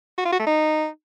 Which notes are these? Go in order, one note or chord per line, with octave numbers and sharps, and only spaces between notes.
F#4
F4
F#4
A3
D#4